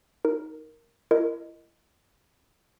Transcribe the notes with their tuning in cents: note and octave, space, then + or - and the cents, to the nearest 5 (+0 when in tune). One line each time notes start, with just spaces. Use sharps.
D#4 +15 A#4 +0
E4 +40 A#4 -15 D#5 +0